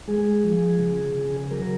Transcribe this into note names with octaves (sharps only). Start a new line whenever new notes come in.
G#3 G#4
F3
C#3
C#3
F#3 A#4